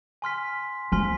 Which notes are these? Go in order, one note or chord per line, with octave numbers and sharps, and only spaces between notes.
G#5 C6 F6 B6
F3 G#5 C6 F6 B6